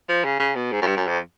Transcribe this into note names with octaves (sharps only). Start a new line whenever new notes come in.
F3
C#3
C#3
B2
G#2
F#2
G2
F#2
F2